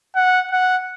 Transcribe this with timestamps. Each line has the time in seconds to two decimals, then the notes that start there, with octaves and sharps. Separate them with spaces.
0.15 F#5
0.52 F#5